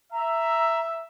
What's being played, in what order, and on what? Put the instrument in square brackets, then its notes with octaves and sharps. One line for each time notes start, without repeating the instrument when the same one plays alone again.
[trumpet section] E5 [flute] A#5